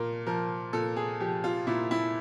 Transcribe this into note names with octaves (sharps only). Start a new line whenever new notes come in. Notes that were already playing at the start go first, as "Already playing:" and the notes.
Already playing: A#2 A#4
F3 A#4
A#2 A4
G#4
F3 G4
F4
A#2 E4
E4